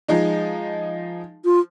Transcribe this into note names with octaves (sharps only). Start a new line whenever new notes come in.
F3 G#3 D#4
F4